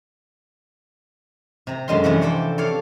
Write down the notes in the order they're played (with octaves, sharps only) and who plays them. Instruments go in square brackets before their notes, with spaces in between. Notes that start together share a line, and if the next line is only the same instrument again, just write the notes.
[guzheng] C3 A#5
F#2 D3 G#3 C#4 C6
C3 E3 F3 C4 F#4
A4 C5 D5 G5
A4 C#5 D5 F5